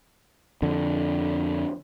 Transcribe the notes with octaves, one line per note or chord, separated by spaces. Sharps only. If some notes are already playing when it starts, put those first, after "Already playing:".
F2 D3